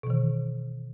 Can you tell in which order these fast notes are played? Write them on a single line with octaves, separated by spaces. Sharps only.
B2 E3 D#3